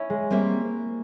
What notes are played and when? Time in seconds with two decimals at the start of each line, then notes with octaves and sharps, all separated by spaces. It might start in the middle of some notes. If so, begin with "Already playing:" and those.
Already playing: C#4 E4
0.10 G#3
0.30 G3 A#3 C4 G4 A#4 E5